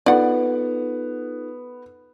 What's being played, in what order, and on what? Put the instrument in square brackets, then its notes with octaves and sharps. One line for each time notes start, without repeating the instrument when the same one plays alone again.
[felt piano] B3 [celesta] D#4 F4 A4 [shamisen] D5 F#5